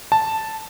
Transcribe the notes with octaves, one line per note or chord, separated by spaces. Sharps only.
A5